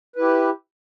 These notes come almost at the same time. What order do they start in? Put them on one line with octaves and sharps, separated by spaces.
B4 E4 G4